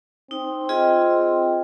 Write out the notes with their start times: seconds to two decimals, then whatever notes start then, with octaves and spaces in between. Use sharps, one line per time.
0.31 C4 D#4
0.69 F4 G#4 D#5